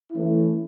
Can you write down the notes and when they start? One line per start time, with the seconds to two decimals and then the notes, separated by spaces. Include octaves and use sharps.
0.11 E3 A3 C#4 E4